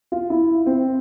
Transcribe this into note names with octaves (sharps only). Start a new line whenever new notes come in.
F4
E4
C4